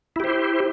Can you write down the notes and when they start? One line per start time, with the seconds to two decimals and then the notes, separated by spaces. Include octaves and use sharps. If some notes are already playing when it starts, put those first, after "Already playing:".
0.16 E4
0.20 G4
0.24 C5